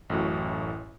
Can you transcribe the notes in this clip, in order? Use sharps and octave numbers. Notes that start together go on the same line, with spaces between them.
A1 F#2 A2 F#4